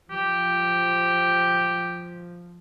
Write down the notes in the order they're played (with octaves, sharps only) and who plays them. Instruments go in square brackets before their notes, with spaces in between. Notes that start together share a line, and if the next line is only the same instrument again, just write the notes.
[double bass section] F3 [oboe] G4